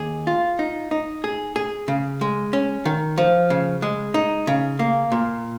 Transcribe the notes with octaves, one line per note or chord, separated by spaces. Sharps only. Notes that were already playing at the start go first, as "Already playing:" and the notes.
Already playing: D#2 G#4
F4
D#4
D#4
G#4
G#4
C#3
G#3
C#4
D#3
F3
C#3
G#3
D#4
C#3
A#3
A#2